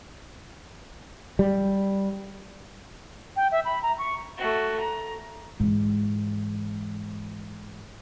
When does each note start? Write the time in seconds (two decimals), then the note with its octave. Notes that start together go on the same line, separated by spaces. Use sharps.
1.39 G3
3.36 G5
3.52 E5
3.65 B5
3.82 A#5
3.98 C#6
4.38 A3 F#4
4.80 A#5
5.60 G#2 E3